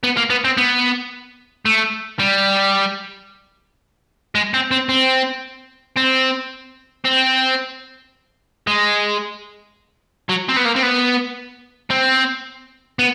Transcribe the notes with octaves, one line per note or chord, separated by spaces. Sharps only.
B3
A#3
B3
C4
B3
A3
G3
G#3
C4
C4
C4
C4
C4
G#3
F#3
C4
B3
A#3
C4
B3
C4
B3